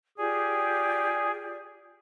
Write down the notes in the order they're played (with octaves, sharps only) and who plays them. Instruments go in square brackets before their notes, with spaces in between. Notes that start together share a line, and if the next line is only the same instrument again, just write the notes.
[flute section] F4 G4 D5 [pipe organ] G#4